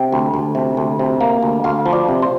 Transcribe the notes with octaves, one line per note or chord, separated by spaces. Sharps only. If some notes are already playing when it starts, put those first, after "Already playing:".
Already playing: C3 G5
D2
D2
C3
D2
C3
A#3
D2
D2 F5
F3
D5
C3
C5